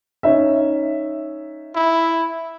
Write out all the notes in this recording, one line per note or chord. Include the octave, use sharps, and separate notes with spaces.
C#4 D#4 E5
E4